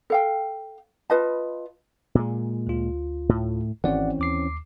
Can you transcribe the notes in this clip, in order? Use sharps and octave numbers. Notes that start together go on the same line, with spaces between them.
A4 F5 G5
F4 B4 D#5 A5
A#2 G#3
D2 F4
A2
G#1 E3 C4 C#4 D5 F#5
D#2 D6 C7